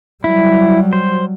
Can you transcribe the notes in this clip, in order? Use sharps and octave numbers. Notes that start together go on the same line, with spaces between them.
F#3 G3 E4
C5